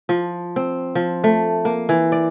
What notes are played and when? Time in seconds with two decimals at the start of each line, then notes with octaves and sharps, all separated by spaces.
0.09 F3
0.56 C4
0.95 F3
1.24 A3
1.65 A#3
1.89 E3
2.12 D5